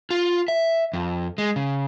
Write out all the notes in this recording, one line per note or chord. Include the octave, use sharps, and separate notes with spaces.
F4
E5
F2
G#3
C#3